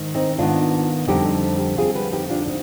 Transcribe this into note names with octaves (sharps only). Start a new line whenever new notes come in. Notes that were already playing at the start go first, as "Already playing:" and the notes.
Already playing: G#2 D#3
C4 D#4
G#2 D#3 B3 D4 F4
F2 D3 G3 C4 D#4 G4
F2 D3 G3 C4 F4 G#4
G4 B4
D#4 G4
D4 F4
C4 D#4